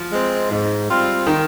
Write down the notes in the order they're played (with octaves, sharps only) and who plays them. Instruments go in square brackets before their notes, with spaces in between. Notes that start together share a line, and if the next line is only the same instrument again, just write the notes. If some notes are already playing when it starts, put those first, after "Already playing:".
Already playing: [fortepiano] F3
[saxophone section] G#3 C4
G#2
G3 C4 F4
[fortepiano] D#3